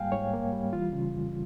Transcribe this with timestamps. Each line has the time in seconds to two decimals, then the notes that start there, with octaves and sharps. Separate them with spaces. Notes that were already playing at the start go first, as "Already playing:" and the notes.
Already playing: G#2 G3 A#3 F5 G5 G#5
0.12 G#2 C#5
0.33 A#3
0.52 G3
0.73 E3 F4
0.93 C#3
1.13 F2